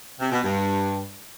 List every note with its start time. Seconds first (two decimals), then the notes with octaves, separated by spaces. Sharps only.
0.20 C3
0.32 B2
0.43 G2